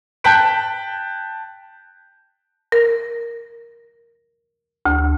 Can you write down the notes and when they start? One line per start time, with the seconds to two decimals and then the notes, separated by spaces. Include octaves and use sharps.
0.24 G5 A5 F#6 G6 B6 D7
2.72 A#4
4.86 D2